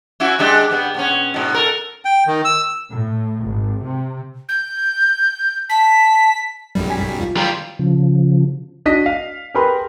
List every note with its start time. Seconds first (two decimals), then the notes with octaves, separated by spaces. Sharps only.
0.20 C#4 E4 F#4
0.39 G#3 D4 G4
0.70 G2 G3 B3
0.94 A#2 B3 C#4
1.34 G#2 B2
1.54 A4 A#4
2.05 G5
2.27 D#3
2.45 E6
2.91 A2
3.41 G#1
3.82 C3
4.49 G6
5.69 A5 B6
6.75 B1 F#2 F#3 G3
6.90 G#5 B6
7.21 F4
7.37 G3 F4 A#5
7.79 C#3 F3
8.86 D4 F#4 D#5 B6
9.06 F5
9.54 G4 G#4 A#4 B4 B5 C6